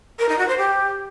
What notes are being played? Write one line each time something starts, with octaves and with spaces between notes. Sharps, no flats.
A#4
D#4
F#4
C5
G4